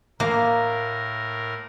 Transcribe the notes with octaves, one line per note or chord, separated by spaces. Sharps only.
A2 A#3 A#4